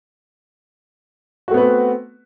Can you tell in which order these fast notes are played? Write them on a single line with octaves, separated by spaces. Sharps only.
F#4 A3 B3 B4 C4